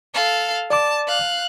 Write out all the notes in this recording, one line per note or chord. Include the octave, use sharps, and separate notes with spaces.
A4 F5
D5 A5 D6
F5 F#6